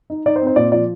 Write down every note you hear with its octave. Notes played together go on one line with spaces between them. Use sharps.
D#4
D#4 D5
C5
C4
C5
A#2 D5
F3 D5